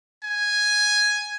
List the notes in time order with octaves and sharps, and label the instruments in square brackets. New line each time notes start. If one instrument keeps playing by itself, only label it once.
[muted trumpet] G#5